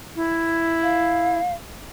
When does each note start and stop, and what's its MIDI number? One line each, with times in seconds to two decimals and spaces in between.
0.16 1.39 64
0.83 1.54 77